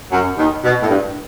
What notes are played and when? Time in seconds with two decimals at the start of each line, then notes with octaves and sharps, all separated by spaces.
0.11 F#2 F#3
0.38 D#2 D#3
0.64 B2
0.82 A2
0.89 G2